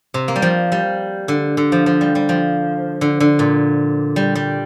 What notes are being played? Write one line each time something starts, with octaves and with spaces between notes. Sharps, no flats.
C3
A#3
G3
F3
G3
D3
D3
F3
F3
G3
G3
F3
D3
D3
A#2
G3
G3